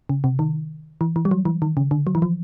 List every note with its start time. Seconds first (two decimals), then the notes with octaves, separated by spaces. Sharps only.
0.09 C#3
0.24 C3
0.39 D#3
1.01 E3
1.16 E3
1.25 G3
1.31 F#3
1.45 E3
1.62 D#3
1.77 C#3
1.91 D3
2.07 F#3
2.15 E3
2.22 F3